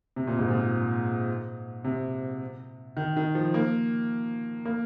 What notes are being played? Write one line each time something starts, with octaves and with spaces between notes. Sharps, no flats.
C3
A#2
G#2
A#2
C3
D#3
D#3
F3
A#3
A#3